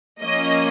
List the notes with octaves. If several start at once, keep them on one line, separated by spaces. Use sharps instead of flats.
F3 A#3 C#4 D#5